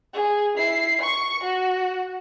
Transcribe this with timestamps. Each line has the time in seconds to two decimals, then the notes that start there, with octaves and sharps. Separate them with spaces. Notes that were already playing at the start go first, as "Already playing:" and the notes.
0.13 G#4
0.57 E4 C7
1.01 C#6 C#7
1.43 F#4